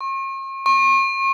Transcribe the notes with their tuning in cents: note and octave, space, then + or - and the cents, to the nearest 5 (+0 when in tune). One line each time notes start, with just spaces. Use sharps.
C#6 -45
C#6 -40